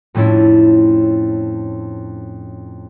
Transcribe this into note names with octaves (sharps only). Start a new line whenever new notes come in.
F2 A2 C#4 D4 E4